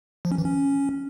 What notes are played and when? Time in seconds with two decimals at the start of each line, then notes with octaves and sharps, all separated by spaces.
0.25 F3
0.32 C#4
0.38 E3
0.45 C#4